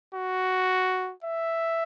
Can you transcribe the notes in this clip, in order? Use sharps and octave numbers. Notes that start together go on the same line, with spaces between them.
F#4
E5